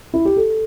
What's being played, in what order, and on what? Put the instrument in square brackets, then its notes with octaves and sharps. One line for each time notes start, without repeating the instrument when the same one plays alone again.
[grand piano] E4
G4
A4